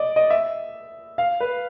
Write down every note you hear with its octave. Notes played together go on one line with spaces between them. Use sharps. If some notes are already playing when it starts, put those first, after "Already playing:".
Already playing: D5 D#5
D#5
E5
F5
B4